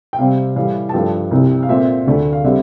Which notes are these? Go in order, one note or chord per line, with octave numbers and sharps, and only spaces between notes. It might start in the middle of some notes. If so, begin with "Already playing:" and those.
G5
C3 G3 C4 F5
A2 E3 G3 F5
A5
G2 F3 A3 G5
C2 C3 G3
F5
A#2 A3 C4 E5
D2 D3 A3 D4
F5
D3 G3 C4 E5